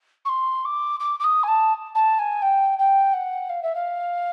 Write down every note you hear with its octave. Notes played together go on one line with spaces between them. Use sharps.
C#6
C6
D6
D6
D6
D#6
G#5
A5
A5
G#5
G5
G5
F#5
F5
E5
F5